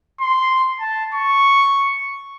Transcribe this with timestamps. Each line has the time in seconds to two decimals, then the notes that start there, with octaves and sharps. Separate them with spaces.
0.21 C6
0.80 A5
1.14 C#6